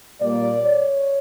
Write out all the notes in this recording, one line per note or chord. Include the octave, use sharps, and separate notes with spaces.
A#2 G3 A#3 D5
C#5